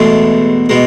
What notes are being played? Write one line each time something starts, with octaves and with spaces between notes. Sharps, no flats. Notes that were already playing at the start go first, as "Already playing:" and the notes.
Already playing: E2 B2 G#3 A3 A4
B2 G#3